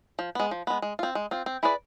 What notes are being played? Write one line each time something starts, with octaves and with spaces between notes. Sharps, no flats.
F3
G#3 B3
F3
G#3 B3
G#3
C4 F4
G#3
C4 F4
C4
E4 G#4 B4 D5